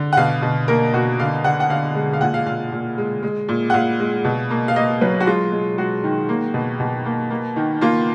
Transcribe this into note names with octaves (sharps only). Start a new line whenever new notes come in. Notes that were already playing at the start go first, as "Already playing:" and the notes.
Already playing: D3
F#5
B2 F5
B2
A#3 A#4
B2 F#4
D3 F5
D3 F#5
F#5
D3 F5
G#3
F5
A#2 F#5
F5
A#2 F5
A#2
G#3
G#3
A#2
F#5
A#2 F5
G#3
B2
A#3
F5
A#3 D#5
F#3 B4
F#4
G#3 F4
G#3
G#3 F#4
D#3
A#3
B2
B2
A#3
A#3
D#3
A#3 F4